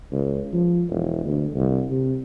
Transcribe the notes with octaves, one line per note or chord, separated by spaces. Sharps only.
C#2
F3
E1
D2
C2
C3